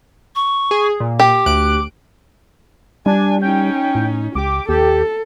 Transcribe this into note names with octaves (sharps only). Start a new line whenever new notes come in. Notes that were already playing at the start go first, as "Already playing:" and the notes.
C#6
G#4
A#2
G4 D6
D2 F#6 D7
G3 D4 G#5
C#4 D#4 G5
A2
C#2 G4 D6
D#2 G4 A4